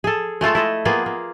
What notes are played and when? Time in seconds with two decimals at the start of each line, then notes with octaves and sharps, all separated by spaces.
0.04 G#4 A4
0.41 G#3 A3 F4 A4
0.55 E4 A4 D#5
0.85 A#3 B3 F4 G#4
1.06 A#3